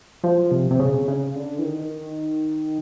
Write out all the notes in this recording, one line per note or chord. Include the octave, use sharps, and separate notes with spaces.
F3
C3
C3
C#3
C#3
D3
E3
D#3